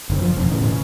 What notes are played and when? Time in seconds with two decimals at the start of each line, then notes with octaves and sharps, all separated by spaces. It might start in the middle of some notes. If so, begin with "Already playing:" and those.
0.10 F#1 D3
0.22 F3
0.37 E1 F2
0.51 A2 C#3 E3
0.68 C#3